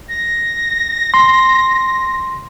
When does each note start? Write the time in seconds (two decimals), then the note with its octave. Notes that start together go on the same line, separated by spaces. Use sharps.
0.09 A#6
1.14 C6